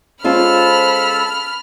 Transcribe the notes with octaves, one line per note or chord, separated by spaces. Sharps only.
G#3 C#4 F4 A4 C5 A5 B5 F6